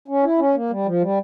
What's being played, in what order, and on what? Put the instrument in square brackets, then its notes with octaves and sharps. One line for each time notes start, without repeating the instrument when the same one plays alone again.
[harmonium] C#4
E4
C#4
A#3
G3
F3
G3